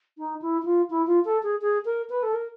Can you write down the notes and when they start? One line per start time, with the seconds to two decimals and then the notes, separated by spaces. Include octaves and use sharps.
0.18 D#4
0.42 E4
0.62 E4
0.65 F4
0.90 E4
1.07 F4
1.25 A4
1.43 G#4
1.62 G#4
1.85 A#4
2.10 B4
2.23 A4
2.33 A#4